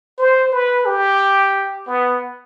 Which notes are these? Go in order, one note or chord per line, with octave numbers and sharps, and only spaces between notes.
C5
B4
G4
B3